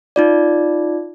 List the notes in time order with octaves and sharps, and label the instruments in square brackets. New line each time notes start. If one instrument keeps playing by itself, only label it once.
[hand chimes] D#4 F4 D5